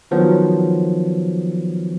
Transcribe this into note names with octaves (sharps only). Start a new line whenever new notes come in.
D#3 F3 F#3 B3